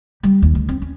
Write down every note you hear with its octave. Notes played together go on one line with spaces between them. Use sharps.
G3
D#2
D2
C4
C#4